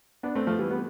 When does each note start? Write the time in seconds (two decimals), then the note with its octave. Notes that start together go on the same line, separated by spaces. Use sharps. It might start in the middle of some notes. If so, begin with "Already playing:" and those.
0.23 B3 D4
0.35 A3 C4
0.47 F3 A3
0.59 E3 G3
0.71 G3 B3